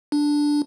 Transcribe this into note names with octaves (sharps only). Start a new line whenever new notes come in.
D4